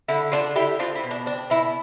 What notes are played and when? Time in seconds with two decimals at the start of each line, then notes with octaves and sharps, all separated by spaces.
0.08 D3 E4
0.32 D3 D4 F4
0.55 D3 E4 G4
0.79 C4 D4 F4
0.95 E4
1.04 B2
1.11 D4
1.26 C4 D4
1.50 B2 E4